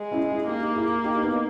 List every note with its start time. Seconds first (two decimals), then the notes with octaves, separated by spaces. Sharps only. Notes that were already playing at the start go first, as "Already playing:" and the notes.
Already playing: G#3
0.12 C#4 E4
0.30 E4 G#4
0.48 A#3 D#4 G4
0.76 E4 G#4
1.04 D#4 G4
1.22 B3 D#4